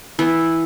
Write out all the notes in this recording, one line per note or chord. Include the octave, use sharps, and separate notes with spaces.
E3 B3 E4